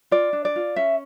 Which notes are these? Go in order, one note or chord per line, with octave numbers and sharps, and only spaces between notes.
F4 D5
D4
D5
F4
C#4 E5